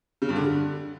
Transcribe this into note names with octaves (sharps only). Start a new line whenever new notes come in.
C#3
G2
D3